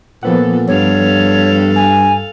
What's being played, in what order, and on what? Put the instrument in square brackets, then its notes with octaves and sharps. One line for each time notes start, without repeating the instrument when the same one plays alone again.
[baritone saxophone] A#2 [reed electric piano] F3 B3 F#5 [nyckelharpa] A4
[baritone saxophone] G2 [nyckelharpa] A4 F5 [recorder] C#5
[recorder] G#5